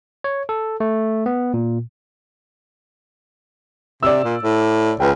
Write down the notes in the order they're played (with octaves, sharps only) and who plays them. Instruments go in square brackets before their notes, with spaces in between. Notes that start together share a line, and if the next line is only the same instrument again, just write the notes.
[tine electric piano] C#5
A4
A3
B3
A#2
[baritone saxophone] C3 [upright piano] D5 E6
[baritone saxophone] A#2
A2
[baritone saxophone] C#2 [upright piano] B4 G5